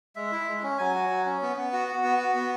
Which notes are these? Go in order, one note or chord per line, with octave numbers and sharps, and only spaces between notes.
G#3 E5
E4
G#3
C#4
F#3 G#5
F#4
F#3
C#4
B3
B3
F#4
F#4
B3
F#4
B3